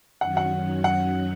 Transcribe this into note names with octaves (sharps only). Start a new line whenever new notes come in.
F#2 D#3 F#3 C#4 F#5
F#5
F#5